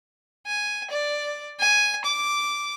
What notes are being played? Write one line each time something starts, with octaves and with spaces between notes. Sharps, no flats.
G#5
D5
G#5
D6